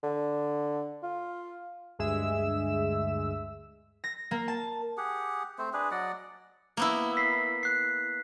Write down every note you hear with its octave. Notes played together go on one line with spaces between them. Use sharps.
D3
F4
D2 G2 G#3 G#4 E5 E6
A#6
A#3
A5
G4 G#4 F#5
A3 C4 C5
D4 G#4 B4
F#3 D5 D#5 F#5
A#3 B3 E4
B6 C7
F#6 C7